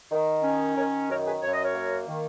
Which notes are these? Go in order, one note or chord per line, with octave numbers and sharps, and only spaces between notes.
D#3
C#4
D#3 A#4 C#5
F#2 A#4 C#5
G#4 B4
F#2 C#5
D#5
A#4 C#5
A#3
D#3